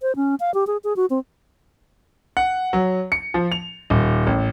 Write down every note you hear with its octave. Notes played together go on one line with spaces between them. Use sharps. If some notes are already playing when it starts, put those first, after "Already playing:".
C5
C#4
F5
G4
G#4
G#4
F#4
C4
F#5
F#3
C#7
F3
F7
D#1
A1